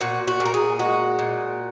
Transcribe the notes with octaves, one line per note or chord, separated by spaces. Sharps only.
A#2 F#4
F#4
A#2
A#4
G#4
G#3 F#4
A#2